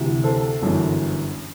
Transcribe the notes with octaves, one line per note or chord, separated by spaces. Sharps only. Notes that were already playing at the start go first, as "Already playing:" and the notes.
Already playing: D2 C3 E3
A4 C5
G1 F#2 E3